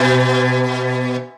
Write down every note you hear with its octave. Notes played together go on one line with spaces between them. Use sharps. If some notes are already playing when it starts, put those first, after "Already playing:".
Already playing: B2